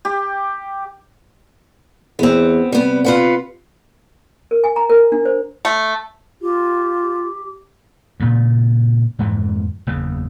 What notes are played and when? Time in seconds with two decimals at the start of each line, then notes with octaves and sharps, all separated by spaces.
0.05 G4
2.19 E2 B3 C4
2.72 C3 G3 B3
3.05 F4 B4 F#5
4.51 A#4
4.64 G#5
4.76 A#5
4.90 A#4
5.12 D4
5.25 C5
5.65 A3
6.42 F4 G4
8.20 G2 A#2 C#3
9.19 F2 G#2 D3 E3
9.87 F#1 E2 C#3